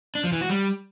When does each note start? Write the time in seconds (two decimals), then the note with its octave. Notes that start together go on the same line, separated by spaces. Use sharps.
0.15 D4
0.24 F3
0.32 E3
0.41 F#4
0.50 G3